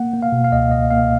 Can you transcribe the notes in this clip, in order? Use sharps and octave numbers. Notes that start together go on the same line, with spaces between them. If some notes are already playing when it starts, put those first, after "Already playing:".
Already playing: A#3 F#5
A#3
F5
B2
F5
C#2 D#5
C#2 D#5
A#3 F5